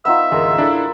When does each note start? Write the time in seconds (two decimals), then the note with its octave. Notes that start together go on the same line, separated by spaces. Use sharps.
0.05 B3 D#4 F4 E5 E6
0.32 A1 D2 G#3 A#4
0.58 D4 E4 A4